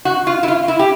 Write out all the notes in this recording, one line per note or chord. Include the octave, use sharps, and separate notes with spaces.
F#4
F4
E4
F4
E4
G4